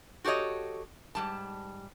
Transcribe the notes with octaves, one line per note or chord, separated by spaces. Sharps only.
F#4 G4 A4 C#5 D#5
G#2 G3 A5